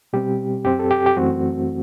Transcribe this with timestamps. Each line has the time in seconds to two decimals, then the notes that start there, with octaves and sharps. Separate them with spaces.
0.13 B2 G3 C4 G4
0.65 F#2 F#3 C4 G4
0.79 A4
0.91 G4
1.06 G4
1.17 F#2 E3 A3 C4 F#4